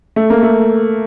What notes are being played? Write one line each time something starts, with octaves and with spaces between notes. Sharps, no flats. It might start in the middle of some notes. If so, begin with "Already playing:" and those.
A3
A#3
A3